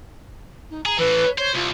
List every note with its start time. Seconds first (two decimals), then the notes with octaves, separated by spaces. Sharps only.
0.70 D#4
0.86 G#4 A#5
0.98 A2 E3 B4
1.38 C5 C#5
1.54 C2 F4